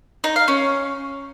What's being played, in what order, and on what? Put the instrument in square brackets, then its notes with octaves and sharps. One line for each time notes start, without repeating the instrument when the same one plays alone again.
[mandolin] D#4
F5
C#4